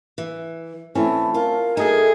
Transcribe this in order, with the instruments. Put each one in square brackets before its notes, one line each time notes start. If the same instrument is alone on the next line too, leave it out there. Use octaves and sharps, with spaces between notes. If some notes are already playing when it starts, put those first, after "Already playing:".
[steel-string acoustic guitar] E3
[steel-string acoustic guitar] E3 [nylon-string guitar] A3 C4 C#4 [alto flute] E4
[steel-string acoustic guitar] F4 [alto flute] A#4
[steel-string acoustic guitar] A3 F#4 A4 [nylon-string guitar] D#4 [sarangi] G#4